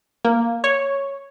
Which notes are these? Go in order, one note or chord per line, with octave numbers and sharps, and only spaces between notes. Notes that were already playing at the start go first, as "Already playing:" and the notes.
A#3
C#5